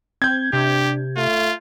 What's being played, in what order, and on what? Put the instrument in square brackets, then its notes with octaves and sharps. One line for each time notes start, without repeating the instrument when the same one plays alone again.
[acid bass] C4 [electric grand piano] G6 G#6
[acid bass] C3 [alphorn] D4 [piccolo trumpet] G4
[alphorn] A3 [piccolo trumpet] F4